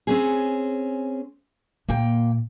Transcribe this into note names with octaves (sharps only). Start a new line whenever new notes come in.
C4 C#4 G#4
A#2 A#3 G5